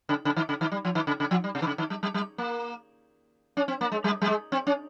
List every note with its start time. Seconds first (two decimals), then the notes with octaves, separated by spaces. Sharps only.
0.09 C#3
0.25 C#3
0.36 D#3
0.49 C#3
0.61 D#3
0.72 G3
0.85 F3
0.95 D#3
1.07 C#3
1.20 C#3
1.31 F3
1.44 G3
1.55 C3
1.62 D#3
1.67 C#3
1.78 D#3
1.90 G3
2.03 G3
2.14 G3
2.38 A#3
3.57 C#4
3.68 C4
3.81 A#3
3.92 G#3
4.04 G3
4.22 G3
4.27 G#3
4.52 C4
4.67 C#4